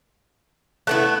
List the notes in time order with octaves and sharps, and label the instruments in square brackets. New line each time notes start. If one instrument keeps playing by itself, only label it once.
[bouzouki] A3 B3 E4 [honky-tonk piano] F#6